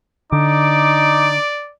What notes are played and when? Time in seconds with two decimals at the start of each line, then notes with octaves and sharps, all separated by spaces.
0.32 D3 D#4 D5 D6